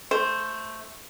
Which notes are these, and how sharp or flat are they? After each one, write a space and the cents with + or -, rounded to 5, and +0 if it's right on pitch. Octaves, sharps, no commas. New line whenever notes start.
A3 +0 C5 +0